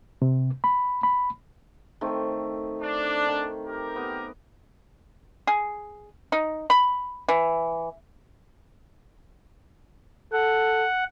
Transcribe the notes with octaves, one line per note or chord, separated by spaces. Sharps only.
C3
B5
B5
D#3 A3 C4
D4
D#3
G4 A#4
B3
G#4
D#4
B5
E3
A4 F#5